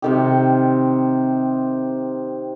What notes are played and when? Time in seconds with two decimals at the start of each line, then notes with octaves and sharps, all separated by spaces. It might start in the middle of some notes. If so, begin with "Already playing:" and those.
0.02 C3 D#3 G4